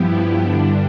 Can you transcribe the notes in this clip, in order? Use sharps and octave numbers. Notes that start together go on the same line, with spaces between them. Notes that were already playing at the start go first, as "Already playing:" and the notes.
Already playing: G2 F3 B3 E4 G4
G2 D3 G3 D4